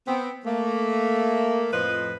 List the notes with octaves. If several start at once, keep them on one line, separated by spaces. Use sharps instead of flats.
B3 C4
A3 A#3
F2 A2 F3 B4 C5 D#5